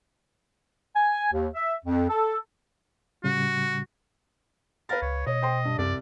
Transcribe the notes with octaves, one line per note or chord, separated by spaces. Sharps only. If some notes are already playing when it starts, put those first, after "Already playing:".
G#5
D#2
E5
F2
A4
A2 C#3 G3 F#4
A#4 B4 F5 A6
C#2 C#5
B2 C#5 D#5
C5 G5 C6
G2
C2 F#2 D5